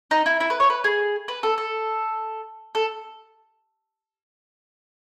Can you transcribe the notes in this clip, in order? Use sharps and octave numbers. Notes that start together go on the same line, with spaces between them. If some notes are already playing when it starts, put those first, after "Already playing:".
D#4
E4
E4
B4
C#5
B4
G#4
B4
A4
A4
A4